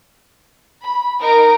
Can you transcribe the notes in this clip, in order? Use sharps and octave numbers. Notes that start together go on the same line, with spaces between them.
B5
D#4 A#4 A#5 D7